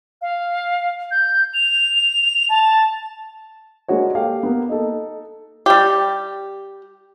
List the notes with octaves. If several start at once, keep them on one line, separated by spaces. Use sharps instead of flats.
F5
G6
F7
A5
G#3 A#3 D4 F#4 C#5
G4 A4 F5 G5
A#3 B3
D#4 A4
G3 G4